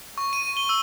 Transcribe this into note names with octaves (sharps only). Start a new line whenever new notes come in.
C#6
D#7
G7
E6